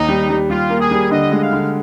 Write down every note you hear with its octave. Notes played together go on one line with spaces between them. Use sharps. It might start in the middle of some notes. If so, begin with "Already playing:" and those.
Already playing: D#2 D#4
G3
G3
G3 F4
A#3
G#4
G3
D3 D#5
G#3
F5
D3